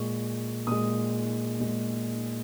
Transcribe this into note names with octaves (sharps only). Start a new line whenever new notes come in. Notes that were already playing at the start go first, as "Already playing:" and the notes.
Already playing: A#2 G#3 C#6
A#2 G#3 D#6
A#2 G#3